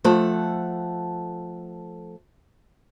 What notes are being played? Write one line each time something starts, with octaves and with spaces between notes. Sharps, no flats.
F3 A3 A4 F#5